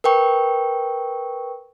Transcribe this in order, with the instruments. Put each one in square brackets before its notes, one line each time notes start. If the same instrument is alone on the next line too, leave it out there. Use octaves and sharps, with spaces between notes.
[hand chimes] A#4 B4 G5 C#6